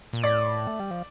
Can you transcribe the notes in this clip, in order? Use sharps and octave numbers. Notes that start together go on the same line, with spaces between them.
A#2
A2 D5
A3
G3
F3